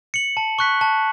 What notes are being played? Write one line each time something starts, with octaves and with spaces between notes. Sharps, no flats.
C#7 F#7
A5
C#6 F#6 B6
A5